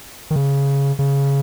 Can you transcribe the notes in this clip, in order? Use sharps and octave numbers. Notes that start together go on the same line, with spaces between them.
D#3
C#3
C#3